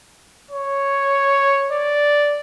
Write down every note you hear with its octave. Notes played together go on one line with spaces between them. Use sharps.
C#5
D5